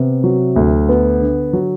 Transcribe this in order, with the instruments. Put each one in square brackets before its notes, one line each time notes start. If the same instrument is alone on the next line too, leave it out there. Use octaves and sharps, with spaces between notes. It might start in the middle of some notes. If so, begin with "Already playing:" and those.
Already playing: [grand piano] C3 B3
F#3
D2
B3
D3
F#3